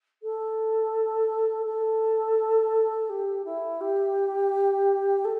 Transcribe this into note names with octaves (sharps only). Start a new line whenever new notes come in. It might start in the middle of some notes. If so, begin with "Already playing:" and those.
A4
A4
G4
E4
G4
A4